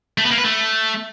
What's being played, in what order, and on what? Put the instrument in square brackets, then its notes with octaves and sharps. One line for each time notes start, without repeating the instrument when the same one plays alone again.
[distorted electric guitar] A3
B3
A#3
B4
A3